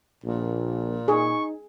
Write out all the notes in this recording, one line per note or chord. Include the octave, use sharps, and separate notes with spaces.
A#1 A#2
D#4 G#4 C#6